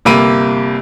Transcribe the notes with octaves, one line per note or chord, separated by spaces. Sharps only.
G1 C3 A#3 B5 D7 D#7